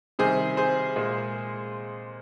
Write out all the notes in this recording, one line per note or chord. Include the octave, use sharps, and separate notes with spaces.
C3 D#3 G3 G#4 C5
G#4 C5
A#2 G#3